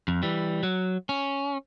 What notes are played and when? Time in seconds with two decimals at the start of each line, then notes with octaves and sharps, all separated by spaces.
0.08 F2
0.23 E3 G3
0.63 F#3
1.09 C#4